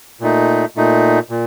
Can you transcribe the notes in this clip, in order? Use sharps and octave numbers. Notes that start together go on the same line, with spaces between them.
A#2 A3 D#4
A#2 A3 D#4
A#2